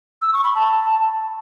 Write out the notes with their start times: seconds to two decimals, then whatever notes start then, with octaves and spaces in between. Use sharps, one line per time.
0.22 E6
0.33 C#6
0.44 B5
0.55 A5